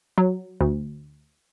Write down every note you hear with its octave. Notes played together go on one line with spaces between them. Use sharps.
F#3
D2